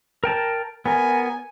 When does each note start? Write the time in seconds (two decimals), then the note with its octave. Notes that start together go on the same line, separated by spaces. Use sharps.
0.24 A#4 G5 A5
0.86 B3 A#4 G#5